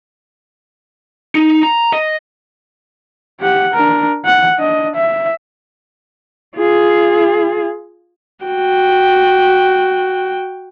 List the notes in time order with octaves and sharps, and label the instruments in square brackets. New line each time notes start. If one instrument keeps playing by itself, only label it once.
[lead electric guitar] D#4
A#5
D#5
[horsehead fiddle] G4 F#5
D4 A#4
F#5
D4 D#5
E5
F4 G#4
[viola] F#4 G5